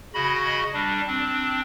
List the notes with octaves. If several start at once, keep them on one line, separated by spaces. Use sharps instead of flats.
C#3 F#4 D#5 B5
G3 D4
C4 D4